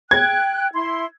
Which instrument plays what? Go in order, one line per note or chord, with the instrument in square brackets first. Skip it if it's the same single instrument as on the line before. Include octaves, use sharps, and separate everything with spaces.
[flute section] G5 F#6 [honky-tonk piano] G#6
[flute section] E4 C6